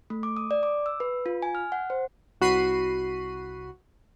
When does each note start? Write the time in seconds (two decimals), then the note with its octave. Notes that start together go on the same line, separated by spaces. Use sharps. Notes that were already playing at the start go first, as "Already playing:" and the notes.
0.10 A3
0.23 D6
0.37 D#6
0.51 D5
0.63 D6
0.86 E6
1.00 B4
1.26 F4
1.42 G#5
1.55 F6
1.72 F#5
1.90 C5
2.41 C2 F#4 B5 C7 D#7